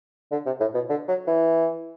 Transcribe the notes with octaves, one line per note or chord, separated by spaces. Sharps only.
D3
C3
A2
B2
D3
F#3
E3